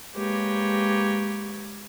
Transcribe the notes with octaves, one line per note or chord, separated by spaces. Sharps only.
G#3 A#3 G4 B4 C#5